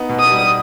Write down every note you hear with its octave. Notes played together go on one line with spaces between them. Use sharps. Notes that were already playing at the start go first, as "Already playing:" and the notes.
Already playing: B3 D#4
B2
D#6
G3